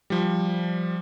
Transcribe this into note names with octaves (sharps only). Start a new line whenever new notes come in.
F3 G3